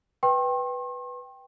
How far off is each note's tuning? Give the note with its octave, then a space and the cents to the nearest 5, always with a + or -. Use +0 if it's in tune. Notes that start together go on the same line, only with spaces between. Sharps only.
B4 +0 G5 +0 C6 +45